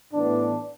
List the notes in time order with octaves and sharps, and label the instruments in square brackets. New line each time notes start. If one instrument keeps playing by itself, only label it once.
[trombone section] A2 E3 B3 D4